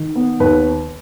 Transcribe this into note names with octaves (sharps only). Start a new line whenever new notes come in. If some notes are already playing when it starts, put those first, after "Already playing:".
Already playing: D#3
B3
D#2 B4